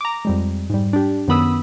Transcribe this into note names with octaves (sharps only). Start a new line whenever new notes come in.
A#5 D6
F2 G3 G#3
G#2 G3
D4 G4
F#2 D#3 B3 B5 D#6 E6